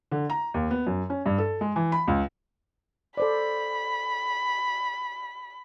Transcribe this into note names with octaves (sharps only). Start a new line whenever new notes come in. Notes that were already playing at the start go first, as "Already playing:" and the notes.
D3
A#5
D#2
B3
F#2
C#4
G2
A4
G#3
E3
B5
C#2
A4 C5 D5 B5